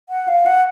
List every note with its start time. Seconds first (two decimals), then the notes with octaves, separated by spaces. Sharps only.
0.09 F#5
0.28 F5
0.46 F#5